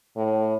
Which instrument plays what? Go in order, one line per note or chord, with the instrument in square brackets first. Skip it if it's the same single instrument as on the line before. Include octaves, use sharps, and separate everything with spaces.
[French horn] A2